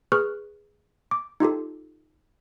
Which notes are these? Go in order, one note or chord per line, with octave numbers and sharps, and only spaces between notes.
G#4 B4 C#6 F6 F#6
D6
D#4 F4 G4 A4